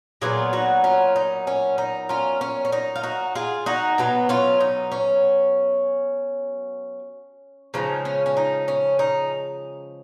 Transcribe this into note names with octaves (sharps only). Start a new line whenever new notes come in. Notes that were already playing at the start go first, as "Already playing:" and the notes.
A#2 F#3 B3 F4 G#4
D#4 F#4
C#4 F4
D#4
C#4
D#4
C#4 F4
C#4
C#4
D#4
F4
D#4 F#4
F4 G#4
D#4 F#4
B2 F#3 B3
C#4 F4
D#4
C#4
C#3 F3 G#3 D#4
C#4
C#4
D#4
C#4
D#4